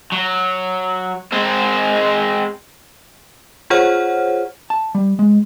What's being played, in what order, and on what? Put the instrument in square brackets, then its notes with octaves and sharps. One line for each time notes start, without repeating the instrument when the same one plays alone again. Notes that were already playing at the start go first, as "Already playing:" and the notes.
[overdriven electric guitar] F#3
G#3 C4
[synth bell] F4 G#4 C5 C#5 F#5 F6
[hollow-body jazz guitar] A5
G3
G#3